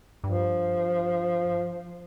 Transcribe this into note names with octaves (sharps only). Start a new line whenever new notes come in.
G2 F3